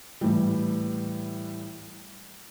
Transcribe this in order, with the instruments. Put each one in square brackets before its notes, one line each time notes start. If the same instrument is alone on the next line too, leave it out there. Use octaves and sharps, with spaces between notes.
[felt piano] A2 E3 G3